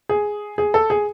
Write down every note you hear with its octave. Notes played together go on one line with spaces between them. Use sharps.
G#4
G#4
A4
G#4